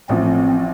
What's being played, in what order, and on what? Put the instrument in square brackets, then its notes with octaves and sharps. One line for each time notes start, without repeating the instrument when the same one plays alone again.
[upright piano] A1 A2 F3 [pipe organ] C4